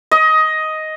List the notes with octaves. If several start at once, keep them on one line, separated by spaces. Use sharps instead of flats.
D#5